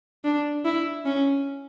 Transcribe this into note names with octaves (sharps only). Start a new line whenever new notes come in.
D4
E4
C#4